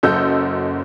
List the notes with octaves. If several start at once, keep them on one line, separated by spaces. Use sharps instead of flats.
F#1 F#2 A4 D#5 E6 G6